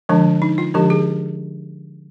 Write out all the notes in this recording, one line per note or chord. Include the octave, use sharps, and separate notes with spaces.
D3 F3 G#3 D4
D#4
F4
D3 F3 G#3 D4 G4
G#4